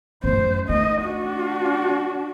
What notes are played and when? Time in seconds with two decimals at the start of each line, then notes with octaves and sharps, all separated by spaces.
0.24 F#2 A3 C5
0.69 A3 D#4 D#5
1.05 D4 F#4